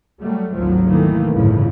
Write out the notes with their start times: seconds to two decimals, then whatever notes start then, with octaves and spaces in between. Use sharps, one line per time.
0.19 F#3 G3 A3
0.53 G#1 D2 F3 F#3
0.86 B2 D#3 E3 A3 A#3
1.32 G1 C#2 A2 C#3 E3 F3